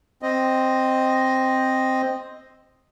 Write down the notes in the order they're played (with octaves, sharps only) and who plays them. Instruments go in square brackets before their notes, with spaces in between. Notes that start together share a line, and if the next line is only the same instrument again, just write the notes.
[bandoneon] C4 D#5